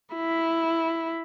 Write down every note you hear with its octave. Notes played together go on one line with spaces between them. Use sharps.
E4